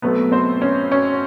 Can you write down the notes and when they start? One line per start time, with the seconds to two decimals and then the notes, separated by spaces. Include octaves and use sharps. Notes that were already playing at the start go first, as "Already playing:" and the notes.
0.02 B2 F#3 A3 B3 C4 B4
0.32 C4 C5
0.61 C#4 C#5
0.92 C#4 C#5